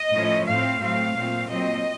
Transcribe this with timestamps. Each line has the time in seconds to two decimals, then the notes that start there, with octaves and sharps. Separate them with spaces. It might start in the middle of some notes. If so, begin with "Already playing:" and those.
Already playing: D#5
0.12 A2 F3 A3 C#4
0.46 A2 A3 C4 F5
0.79 A2 F#3 A3 C4 F5
1.14 A#2 A3 C4
1.47 A#2 F#3 C4 D#5